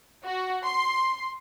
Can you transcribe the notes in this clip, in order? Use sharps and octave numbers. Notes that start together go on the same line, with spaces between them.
F#4
C6